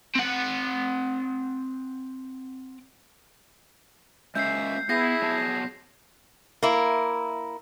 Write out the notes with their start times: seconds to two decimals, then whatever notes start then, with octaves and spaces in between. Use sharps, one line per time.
0.16 C4 F#5
4.35 G#3 A#3 C#4 E5 G6 C7
4.89 B3 E4 G#4 G6 A#6 C7
5.22 F#3 B3 A5
6.63 A#3 E4